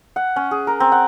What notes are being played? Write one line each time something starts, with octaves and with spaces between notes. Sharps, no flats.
F#5
C#4
G#4
A#4
C4
F#5